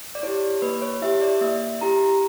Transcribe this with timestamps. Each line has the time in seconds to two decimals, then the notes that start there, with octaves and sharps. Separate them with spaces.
0.15 D5
0.23 E4 G4 C#5
0.62 A#3 B4
0.82 C#5
1.02 E4 G4 E5
1.22 D5
1.41 A#3 E5
1.81 E4 G4 A#5